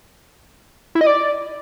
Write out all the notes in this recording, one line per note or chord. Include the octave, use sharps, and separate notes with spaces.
E4
D#5
D5